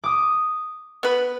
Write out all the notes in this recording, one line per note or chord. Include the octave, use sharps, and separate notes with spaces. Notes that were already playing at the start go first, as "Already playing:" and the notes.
D6 D#6
B3 B4